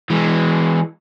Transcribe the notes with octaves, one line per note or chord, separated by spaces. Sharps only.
E3 G#3